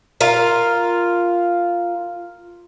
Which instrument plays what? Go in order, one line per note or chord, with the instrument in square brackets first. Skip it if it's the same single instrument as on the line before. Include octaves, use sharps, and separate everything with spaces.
[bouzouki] F4 A#4